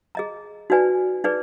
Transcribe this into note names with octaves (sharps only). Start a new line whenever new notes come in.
G#4 D#5 A#5
D#4 F#4 B4 D5 G#5
D#4 G#4 B4 D5